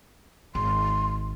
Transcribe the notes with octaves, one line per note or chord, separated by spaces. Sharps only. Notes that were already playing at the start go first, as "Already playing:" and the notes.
G#1 C6